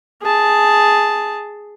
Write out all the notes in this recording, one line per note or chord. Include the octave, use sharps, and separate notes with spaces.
G#4 A5